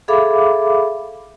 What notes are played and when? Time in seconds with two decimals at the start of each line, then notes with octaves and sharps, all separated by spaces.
0.08 G#4 A4 E5 F5 B5 D6